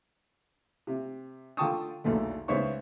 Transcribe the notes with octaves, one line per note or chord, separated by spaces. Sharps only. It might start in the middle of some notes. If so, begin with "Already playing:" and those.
C3
D3 F4 G5 A5 C#6 D#6
B1 E2 A#2 D3 A3
C#2 B3 C5 C#5 E5 C#6